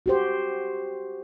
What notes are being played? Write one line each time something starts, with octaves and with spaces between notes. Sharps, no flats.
F#4 G4 C5